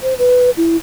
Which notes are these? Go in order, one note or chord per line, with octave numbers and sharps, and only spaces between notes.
C5
B4
E4